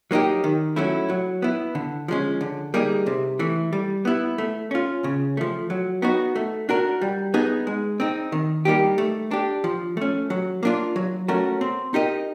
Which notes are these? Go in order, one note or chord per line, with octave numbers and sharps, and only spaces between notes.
F#3 A#3 D#4 G4
D#3
F#3 A3 C#4 E4
F#3
B3 E4
D3
F3 G#3 C#4
D3
G3 A#3 D#4 G#4
C3
E3 A3
G3
B3 E4
A3
C#4 F4
C#3
F3 A3
F#3
B3 D#4 F#4
A3
D4 F#4 A#4
G3
B3 D#4 G#4
G#3
C4 D#4
D#3
G3 A#3 D#4 G4
A3
D4 G4
F3
A3 C#4
F#3
A#3 D4 F4
F#3
A3 C#4 F#4 A#4
C4
D#4 G4 A#4 D#5